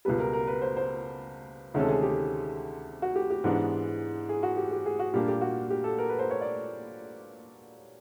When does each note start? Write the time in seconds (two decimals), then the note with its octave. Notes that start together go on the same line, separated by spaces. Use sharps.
0.05 C#2 B2 G3 B4
0.20 A#4
0.33 A#4
0.47 B4
0.62 C5
0.77 C5
1.74 D2 C3 D#3 G#3 C#4 A4
1.89 G#4
2.02 G4
3.02 F#4
3.16 G4
3.30 G4
3.44 G#2 E3 G#3 B3 D4
4.29 G#4
4.43 F#4
4.57 G4
4.71 G4
4.86 G#4
4.99 F#4
5.14 A#2 G3 A#3 D4 G4
5.28 G4
5.41 F#4
5.70 G4
5.84 A4
5.99 A#4
6.09 B4
6.19 C5
6.31 C#5
6.41 D5